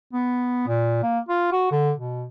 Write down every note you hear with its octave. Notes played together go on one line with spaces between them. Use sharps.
B3
A#2
A#3
F4
F#4
D3
B2